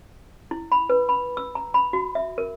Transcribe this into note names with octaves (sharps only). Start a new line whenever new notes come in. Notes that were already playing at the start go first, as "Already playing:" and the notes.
E4
B5
B4
B5
E6
A#5
B5
F#4
E5
A#4